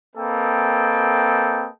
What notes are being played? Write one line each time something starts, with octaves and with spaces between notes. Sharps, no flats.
A#3 C4 A4 B4 D#5 G5